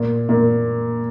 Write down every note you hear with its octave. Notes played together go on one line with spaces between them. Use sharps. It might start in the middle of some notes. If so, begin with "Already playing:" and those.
Already playing: A#2
A#2